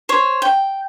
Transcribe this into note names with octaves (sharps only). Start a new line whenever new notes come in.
C5 C#5
G5